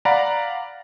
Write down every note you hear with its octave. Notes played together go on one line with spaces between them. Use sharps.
D5 F5 F#5 A#5 B5